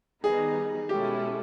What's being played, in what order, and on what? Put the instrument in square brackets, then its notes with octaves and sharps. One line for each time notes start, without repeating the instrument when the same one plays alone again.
[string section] D#3 G3 B3 D#4 [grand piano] G#4
[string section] B2 G#3 C#4 E4 A4 [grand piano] G4